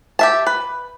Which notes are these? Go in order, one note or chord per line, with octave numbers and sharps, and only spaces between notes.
G4 E5 A5
B4